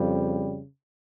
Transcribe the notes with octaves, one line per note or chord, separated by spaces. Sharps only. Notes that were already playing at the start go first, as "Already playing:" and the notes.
Already playing: F2 C#3 G3